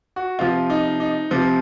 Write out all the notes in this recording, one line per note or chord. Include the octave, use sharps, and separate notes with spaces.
F#4
C3 F3 F4
D#4
D#4
C3 F3